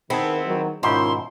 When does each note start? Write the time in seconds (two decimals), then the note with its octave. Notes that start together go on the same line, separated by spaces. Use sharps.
0.10 D#3 B3 C4 E4 G#4 B4 A5
0.45 D#3 F#3
0.83 G#2 B2 D#3 C#4 E4 F4 G4 C6